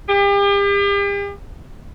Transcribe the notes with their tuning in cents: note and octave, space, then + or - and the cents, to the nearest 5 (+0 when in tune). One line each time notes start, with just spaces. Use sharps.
G4 +40